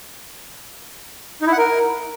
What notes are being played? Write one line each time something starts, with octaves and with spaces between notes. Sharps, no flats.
D#4
E4
F#5
A#4